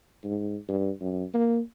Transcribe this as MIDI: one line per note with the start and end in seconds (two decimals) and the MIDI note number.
0.24 0.56 44
0.69 0.90 43
1.01 1.24 42
1.34 1.60 58